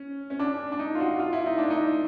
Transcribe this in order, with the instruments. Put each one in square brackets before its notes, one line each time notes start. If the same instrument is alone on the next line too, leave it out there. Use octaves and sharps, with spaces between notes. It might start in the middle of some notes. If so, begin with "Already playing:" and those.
Already playing: [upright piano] C#4
C#4
D4
D4
D#4
F4
F#4
F4
E4
D#4
D4
D#4